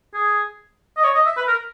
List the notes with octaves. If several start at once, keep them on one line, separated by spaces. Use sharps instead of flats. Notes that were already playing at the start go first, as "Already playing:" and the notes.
G#4
D#5
C#5
D#5
E5
B4
A#4